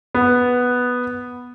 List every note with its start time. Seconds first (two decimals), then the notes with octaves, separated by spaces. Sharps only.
0.15 B3